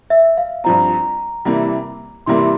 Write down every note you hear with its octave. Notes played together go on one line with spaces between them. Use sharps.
E5
F5
G2 F3 C4 A#5
C3 E3 G3 A#3
C3 E3 G3 A#3 C6